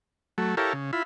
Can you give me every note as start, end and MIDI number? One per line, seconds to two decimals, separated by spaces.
0.38 0.55 54
0.38 0.55 57
0.57 0.73 64
0.57 0.73 67
0.57 0.73 69
0.57 0.73 70
0.57 0.73 73
0.57 0.73 77
0.73 0.91 49
0.93 1.03 64
0.93 1.03 65
0.93 1.03 83